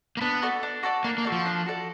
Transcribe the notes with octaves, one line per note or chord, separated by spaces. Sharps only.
A#3
B3 D4
F#4 A4 D5
D4
F#4 A4 D5
A#3 D4
A#3
F#4 A4 D5
F3
D4
F#4 A4 D5